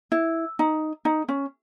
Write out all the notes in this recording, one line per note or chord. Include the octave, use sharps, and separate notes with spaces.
E4
D#4
D#4
C#4